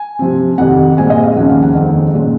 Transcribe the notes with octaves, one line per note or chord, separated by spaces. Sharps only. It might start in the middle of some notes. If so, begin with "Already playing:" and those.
Already playing: G#5
C3 F3 C4
F2 C3 D#3 F#5
A#2 G#3 C4 G#5
D#5
F5
D#2 C#3 F3 A#3 C#4 F#5
F5
F#5
F2 D#3 G#3 C4
A#2 G#3 C#4